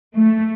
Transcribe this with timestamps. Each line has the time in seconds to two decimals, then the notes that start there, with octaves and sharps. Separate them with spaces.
0.15 A3